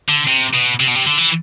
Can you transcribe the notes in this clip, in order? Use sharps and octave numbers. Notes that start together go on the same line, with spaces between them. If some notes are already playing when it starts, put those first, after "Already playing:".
D3
C3
B2
C3
B2
C3
D3
E3